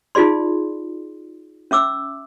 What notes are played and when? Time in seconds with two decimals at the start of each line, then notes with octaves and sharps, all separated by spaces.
0.15 D#4 F4 G#4 D5 C6
1.71 C#4 E5 D6 E6